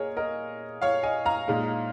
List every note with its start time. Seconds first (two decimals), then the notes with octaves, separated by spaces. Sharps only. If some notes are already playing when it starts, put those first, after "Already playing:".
Already playing: A#2 G#4 A#4 C#5 D#5
0.17 A#4 D#5
0.82 C#5 F5
1.03 D#5 G#5
1.25 F5 A#5
1.48 A#2 G#3 D#4